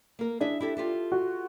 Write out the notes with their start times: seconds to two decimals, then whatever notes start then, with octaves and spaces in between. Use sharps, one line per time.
0.19 A#3 A#4
0.40 D4 E4 G#4 E5
0.61 E4 G4 A4
0.77 F4 G4 A4
1.12 F#4